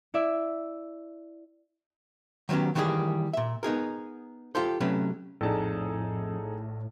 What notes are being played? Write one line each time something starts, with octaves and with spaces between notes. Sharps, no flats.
E4 D5 E5
D#3 F#3 B3 C#4 G4
D#3 E3 G3 A#3 G4 G#4
A#2 E5
B3 D#4 G#4 A#4
F4 G4 A4 C5
C3 F#3 A3 C#4 B4
A#1 F2 A2 D4 D#4 G#4 A4 A5